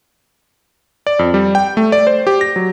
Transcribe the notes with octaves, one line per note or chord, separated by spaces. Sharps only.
D5
F2
G3
G5
A3
D5
C5
G4
A#6
F#3